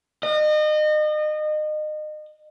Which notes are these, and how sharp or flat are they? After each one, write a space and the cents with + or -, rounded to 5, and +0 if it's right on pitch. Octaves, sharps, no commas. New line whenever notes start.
D#5 -30